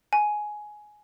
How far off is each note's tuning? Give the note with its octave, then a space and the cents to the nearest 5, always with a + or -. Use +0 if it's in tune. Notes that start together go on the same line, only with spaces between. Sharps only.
G#5 +10